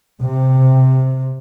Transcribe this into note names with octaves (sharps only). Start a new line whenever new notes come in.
C3